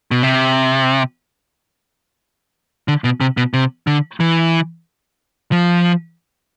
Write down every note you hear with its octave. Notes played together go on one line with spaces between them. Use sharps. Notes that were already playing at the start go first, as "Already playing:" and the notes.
B2
C3
D3
B2
C3
B2
C3
D3
E3
F3